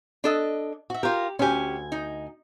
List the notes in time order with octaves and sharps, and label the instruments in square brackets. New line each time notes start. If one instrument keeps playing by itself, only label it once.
[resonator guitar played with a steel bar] D4 A4 D#5
[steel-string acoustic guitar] F#4 E5
[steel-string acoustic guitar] F4 A#4 [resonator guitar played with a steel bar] G4
[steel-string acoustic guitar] D2 G#5 [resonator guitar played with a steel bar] C#4 G4
[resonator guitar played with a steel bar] D#4